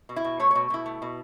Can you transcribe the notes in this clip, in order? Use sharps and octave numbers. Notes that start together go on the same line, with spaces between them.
B2
E4
B2
A3 C#5
B2 C#5
B2 E4
A3
B2